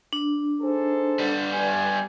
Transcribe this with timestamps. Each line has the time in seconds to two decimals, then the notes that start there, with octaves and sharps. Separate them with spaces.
0.13 D4
0.61 D#4 G#4 A4 C5
1.19 G3 B3
1.53 G2 G#5